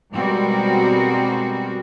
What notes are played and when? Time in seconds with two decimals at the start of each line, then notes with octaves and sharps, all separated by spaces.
0.13 B2 G3 G#3 C4 F#4 A#4